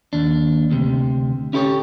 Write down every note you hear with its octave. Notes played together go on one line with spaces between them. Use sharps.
D#2 D4
D2 C3
C#4 E4 G4 A4 C#5